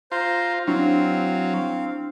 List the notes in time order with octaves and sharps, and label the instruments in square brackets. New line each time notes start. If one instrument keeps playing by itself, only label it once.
[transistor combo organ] F4 [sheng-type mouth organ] C5 A#5
[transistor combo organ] F#3 [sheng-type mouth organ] C4 F5 [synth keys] D4 E4